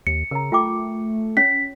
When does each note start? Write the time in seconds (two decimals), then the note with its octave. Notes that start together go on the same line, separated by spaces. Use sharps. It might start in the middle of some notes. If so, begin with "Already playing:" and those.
0.07 D#2 C#7
0.31 C#3 A#4 A#5
0.52 A3 F4 G5 D6
1.37 C#4 C#5 B6